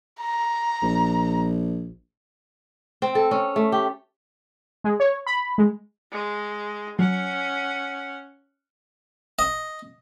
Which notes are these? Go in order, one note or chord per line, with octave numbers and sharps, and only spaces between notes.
A#5
A#1
C4
A4
C#4
A3
G4
G#3
C#5
B5
G#3
G#3
F#3 C#4 F#5
D#5